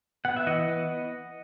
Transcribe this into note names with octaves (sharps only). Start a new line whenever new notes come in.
B3 F#5
E5
E3 D#5 F#5
B3